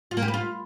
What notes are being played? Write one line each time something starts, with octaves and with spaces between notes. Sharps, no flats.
F4
A#3
G4
B4
F4